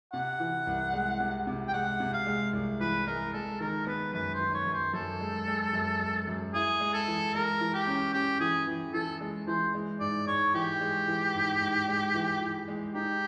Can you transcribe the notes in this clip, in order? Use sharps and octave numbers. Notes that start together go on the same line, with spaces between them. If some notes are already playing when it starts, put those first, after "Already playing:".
C3 F#5
E3
C2
G#3
C3
C3
G5
G#3 F#5
C3
F5
G#3
C2
E3 B4
G#3 A#4
G#3 A4
D#3 A#4
B3 B4
F#2 B4
C5
D#3
C#5
F#2
C5
F#2 A4
G#3
G#3
F#2
G#3
F#2
E4 G#4
G#3
A4
E3
G#3 A#4
E3
G4
C#4
C#4 G4
E3 G#4
E3
E3 A4
G#3
E3 C5
G#3
G#2 D5
G#2 C#5
E3 G4
G#3
E3
G#2
G#2
G#3
E3
E3
G#3
D#4 G4